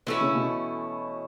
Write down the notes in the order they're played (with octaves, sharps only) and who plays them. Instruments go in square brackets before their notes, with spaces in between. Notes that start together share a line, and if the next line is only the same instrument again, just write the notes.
[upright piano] B2 [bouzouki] E3 A3 C#4 E4
[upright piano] C#3
B2